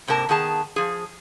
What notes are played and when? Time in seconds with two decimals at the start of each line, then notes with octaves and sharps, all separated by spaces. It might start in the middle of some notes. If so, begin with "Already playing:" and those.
0.08 G#2 C3 A#3 A#4 A5
0.29 D#3 B3 G#4 A5
0.76 F3 G#4